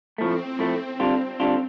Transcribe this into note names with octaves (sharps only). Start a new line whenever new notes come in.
A2 F3 A3 C4
A2 F3 A3
D3 G3 D4 F4
D3 G3 D4 F4